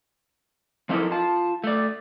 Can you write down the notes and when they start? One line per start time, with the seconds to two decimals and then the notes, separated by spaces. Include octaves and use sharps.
0.89 F3 C4 D#4 E4 A4 A#4
1.11 F4 A5
1.64 A3 D5